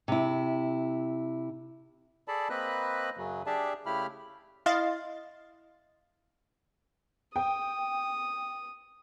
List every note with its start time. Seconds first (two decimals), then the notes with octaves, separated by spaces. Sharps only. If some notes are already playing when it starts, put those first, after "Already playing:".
0.08 C3 E4
2.28 G#4 A4 D5 A5 B5
2.50 A#3 C4 B4 D#5 B5 F#6
3.17 F#2 C#3 F#3
3.46 D4 G4 G#4 D5 E5 A5
3.86 C#3 A3 E4 G4 B5 F6
4.66 E4 D#5 F5 C6 A6
7.36 G5 D#6